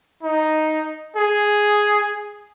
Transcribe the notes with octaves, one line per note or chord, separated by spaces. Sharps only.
D#4
G#4